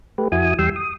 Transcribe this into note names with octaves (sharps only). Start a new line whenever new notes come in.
A3 G4 B4
F2 E4 F#4 G#5 D#6
E2 G3 G5 C6 E6
D#6